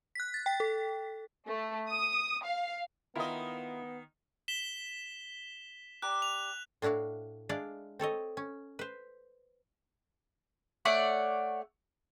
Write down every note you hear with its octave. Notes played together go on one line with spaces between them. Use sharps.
F#6 B6
A6
G5 B6
A4
A3
D#6
F5
D#3 B3 E4 F4 A#4 D#5
B6 E7 G7
G4 D5 A#5 F#6
F7
A2 D4 E4 F#4 F5
G#3 D4 E4 D5 F5
C4 A4 C#5 D#5
C#4
B4 C5
A3 C#5 D5 F#5